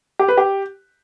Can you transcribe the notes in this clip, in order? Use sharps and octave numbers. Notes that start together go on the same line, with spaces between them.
G4
B4
G4